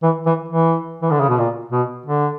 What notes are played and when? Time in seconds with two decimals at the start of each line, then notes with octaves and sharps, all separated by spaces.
0.03 E3
0.26 E3
0.49 E3
1.02 E3
1.11 D3
1.20 C#3
1.29 B2
1.38 A#2
1.72 B2
2.06 D3